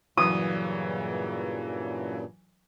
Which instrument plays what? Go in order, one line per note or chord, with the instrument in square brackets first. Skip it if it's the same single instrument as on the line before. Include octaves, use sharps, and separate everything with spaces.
[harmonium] G2 A#2 C#3 [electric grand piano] E3 F#3 [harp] D#6